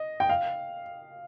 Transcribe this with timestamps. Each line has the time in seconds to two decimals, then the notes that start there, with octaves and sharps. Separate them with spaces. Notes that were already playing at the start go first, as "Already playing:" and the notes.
Already playing: D#5
0.20 G5
0.29 F5